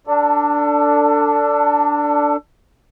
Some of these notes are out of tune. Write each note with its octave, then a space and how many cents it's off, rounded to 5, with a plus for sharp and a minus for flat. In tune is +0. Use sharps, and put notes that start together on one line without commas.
D4 -5 A4 +25